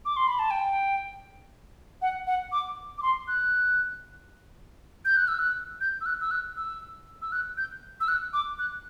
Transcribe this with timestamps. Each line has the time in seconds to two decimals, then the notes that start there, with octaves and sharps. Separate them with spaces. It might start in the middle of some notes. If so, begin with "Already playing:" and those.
0.05 D6
0.16 C6
0.27 B5
0.39 A5
0.50 G5
2.02 F#5
2.27 F#5
2.52 D6
2.98 D6
3.02 C6
3.28 F#6
5.05 G6
5.16 F#6
5.28 E6
5.39 F#6
5.80 G6
6.01 E6
6.06 F#6
6.21 E6
6.31 F#6
6.56 E6
7.22 E6
7.32 F#6
7.57 G6
8.00 E6
8.08 F#6
8.33 D6
8.59 F#6